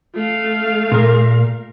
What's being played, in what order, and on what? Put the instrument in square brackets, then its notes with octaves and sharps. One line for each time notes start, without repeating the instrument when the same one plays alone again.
[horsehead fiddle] A3 F5
[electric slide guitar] A#2 A#4